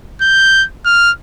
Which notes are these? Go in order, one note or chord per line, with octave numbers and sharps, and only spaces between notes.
G6
F6